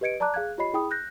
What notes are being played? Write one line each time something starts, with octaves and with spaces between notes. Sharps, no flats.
G4 B4 D#5 G#6 C#7 D7
D5 A5 A#5 D6 F#6
G#4 F5 F#6 G#6
F4 G4 C#5 D#5 B5 C7
E4 G#4 G5 B5 D#6
F#6 G6 A#6